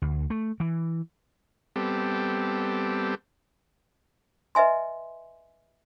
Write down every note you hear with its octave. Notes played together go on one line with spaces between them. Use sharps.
D2
A3
E3
G3 B3 C4 G4 A4
B4 D#5 E5 G#5 C6